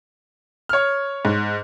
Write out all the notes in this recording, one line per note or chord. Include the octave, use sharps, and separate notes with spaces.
C#5 F6
G#2